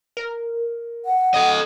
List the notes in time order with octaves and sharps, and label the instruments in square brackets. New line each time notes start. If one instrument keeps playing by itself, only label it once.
[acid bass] A#4
[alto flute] F#5
[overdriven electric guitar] A4 D#5